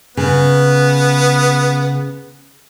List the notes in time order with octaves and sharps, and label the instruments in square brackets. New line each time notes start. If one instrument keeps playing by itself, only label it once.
[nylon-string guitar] C#3 [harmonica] B3